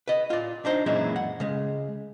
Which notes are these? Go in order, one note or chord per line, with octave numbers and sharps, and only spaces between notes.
B4 D#5
F4 D5
D4 D#4 C5
F#2 A#2 E3 G#3 C#4 E4
F#5
C#3 G#3